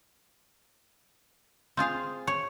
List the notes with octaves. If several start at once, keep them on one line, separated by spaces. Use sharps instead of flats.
C4 F4 G#4 F5
C#5